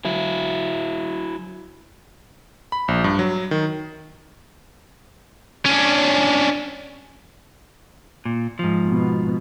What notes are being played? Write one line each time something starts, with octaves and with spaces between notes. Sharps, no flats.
F#3 E4
B5
A#1
G2
F#3
D#3
C#4 D4
A#2
G#2 F3
B2